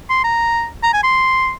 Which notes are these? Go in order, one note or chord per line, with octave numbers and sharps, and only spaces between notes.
C6
A#5
A#5
G#5
C6